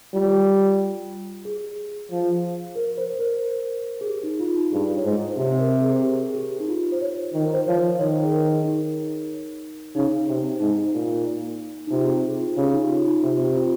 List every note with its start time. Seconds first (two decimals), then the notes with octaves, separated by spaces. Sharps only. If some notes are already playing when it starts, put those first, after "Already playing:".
0.14 G3 F4
1.45 G#4
2.11 F3
2.76 A#4
2.97 C5
3.13 C5
3.19 A#4
4.01 G#4
4.07 G4
4.23 D#4
4.40 F4
4.56 D#4
4.72 G2 G#4
4.97 C#5
5.04 G#2 C5
5.37 C3
5.55 C5
5.60 A#4
5.81 G#4
6.03 G4
6.27 G#4
6.36 G4
6.60 D#4
6.68 F4
6.92 C5
7.01 C#5
7.33 D#3
7.42 A#4
7.54 C5
7.67 F3 C#5
7.99 D#3 C#5
8.24 G#4
8.32 A#4
8.64 D#4
9.95 C#3 D#4
10.28 C3
10.60 G#2 D#4
10.94 A#2
11.87 D#4
11.91 C3 F4
12.01 G#4
12.08 G4
12.24 G#4
12.41 F4
12.56 C#3 G4
12.73 D#4
12.83 G4
12.89 F4
13.06 D#4
13.23 C3 F4
13.44 G4
13.55 F4